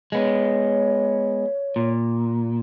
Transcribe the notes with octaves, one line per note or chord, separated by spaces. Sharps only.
G#3 B3 C#5
A#2